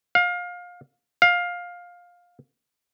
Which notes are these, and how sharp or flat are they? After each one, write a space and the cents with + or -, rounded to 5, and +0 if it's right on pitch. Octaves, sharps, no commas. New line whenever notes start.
F5 +25
F5 +15